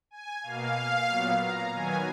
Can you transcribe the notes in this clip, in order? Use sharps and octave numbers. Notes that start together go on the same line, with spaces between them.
G#5
B2 A#3 F5
A#2 F#3 B3
A#5
D#3 F#3 B3 G#5